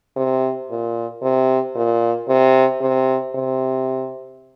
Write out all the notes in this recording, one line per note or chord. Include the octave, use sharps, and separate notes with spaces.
C3
A#2
C3
A#2
C3
C3
C3